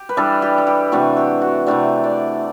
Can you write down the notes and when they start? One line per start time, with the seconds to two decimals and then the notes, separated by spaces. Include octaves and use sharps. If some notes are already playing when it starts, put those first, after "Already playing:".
Already playing: G4
0.09 B4
0.17 E3 G3 D4 A4
0.42 G4
0.58 A4
0.67 G4
0.92 C3 E3 A3 D4 F#4
1.17 G4
1.42 F#4
1.66 C3 E3 A3 D4 G4
2.04 D5